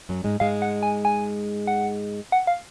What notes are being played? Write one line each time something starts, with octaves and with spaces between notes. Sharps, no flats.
F#2 F#3
G#2 G#3
G#2 G#3 F5
F#5
G#5
G#5
F#5
F#5
F5